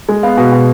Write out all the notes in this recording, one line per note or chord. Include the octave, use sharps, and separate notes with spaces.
G#3
B3 F5
B2
B2